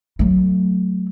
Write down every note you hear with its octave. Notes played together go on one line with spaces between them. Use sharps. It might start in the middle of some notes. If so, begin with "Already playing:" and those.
F#3 A3